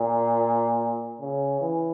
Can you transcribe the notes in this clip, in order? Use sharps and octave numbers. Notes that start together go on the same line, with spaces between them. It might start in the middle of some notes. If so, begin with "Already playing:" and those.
Already playing: A#2
C#3
E3